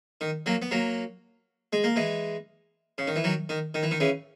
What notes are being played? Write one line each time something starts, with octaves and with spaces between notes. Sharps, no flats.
D#3
F#3 A#3
B3
F#3 A#3
G#3
A#3
E3 G#3
C#3
D#3
E3
D#3 F#3
D#3
D#3
E3
D#3
C#3 E3